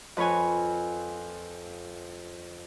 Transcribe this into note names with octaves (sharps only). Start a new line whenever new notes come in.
F2 B4 C#5 G#5